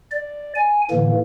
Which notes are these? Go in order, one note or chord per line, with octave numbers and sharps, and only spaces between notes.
D5
G#5
A2 D3 E3 A#3